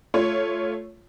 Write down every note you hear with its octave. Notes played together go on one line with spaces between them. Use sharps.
A3 F4 C#5